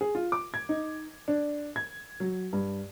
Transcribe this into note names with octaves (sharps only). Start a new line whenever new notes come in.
G#4
F4
D6
G#6
D#4
D4
G#6
F#3
G2